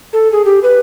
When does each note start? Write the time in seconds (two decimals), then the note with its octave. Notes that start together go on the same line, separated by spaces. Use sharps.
0.13 A4
0.32 G#4
0.45 G4
0.63 B4